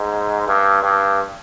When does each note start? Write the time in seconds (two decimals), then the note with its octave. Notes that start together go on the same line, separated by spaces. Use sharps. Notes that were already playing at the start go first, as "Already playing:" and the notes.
Already playing: G#2
0.47 G2
0.83 G2